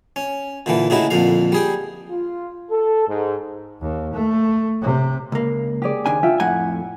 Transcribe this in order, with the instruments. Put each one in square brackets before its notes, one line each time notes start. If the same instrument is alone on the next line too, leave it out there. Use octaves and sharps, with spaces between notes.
[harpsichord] C#4
A#2 D3 E3
A2 C#3 D#4 E4 F#4
F2 A#2 D3 F5
G3 G#4 G5
[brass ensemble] F4
A4
G#2
[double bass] D#2
A3
C3
[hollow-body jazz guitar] C#2 A#3
[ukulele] G4 G#4 D5
[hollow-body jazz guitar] D#2 D4 G#5
[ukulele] F4 E5 G5
[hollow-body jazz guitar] F2 A2 G#5 [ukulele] F#5